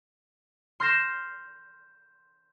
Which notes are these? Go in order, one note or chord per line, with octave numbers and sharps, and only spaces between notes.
C6 F6 G6 A#6 C7 E7